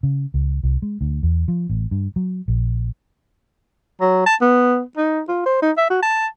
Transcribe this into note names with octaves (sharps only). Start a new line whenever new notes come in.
C#3
C#2
C2
G#3
D2
E2
F3
A1
G2
F#3
A#1
F#3
A5
B3
D#4
F4
C5
D#4
E5
F#4
A5